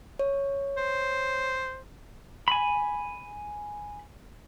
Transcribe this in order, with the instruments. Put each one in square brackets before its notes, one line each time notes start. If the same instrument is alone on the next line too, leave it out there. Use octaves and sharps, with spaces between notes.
[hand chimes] C#5
[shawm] C5
[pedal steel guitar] G#5 B5